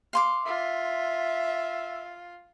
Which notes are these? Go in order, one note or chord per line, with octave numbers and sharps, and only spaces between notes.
F5 C6 D6
F4 E5